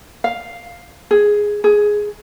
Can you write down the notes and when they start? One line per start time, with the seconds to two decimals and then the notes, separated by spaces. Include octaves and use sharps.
0.24 F5
1.11 G#4
1.64 G#4